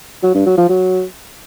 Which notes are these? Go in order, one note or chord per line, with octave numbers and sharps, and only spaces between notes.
F#3
G2
F#3
F3
F#3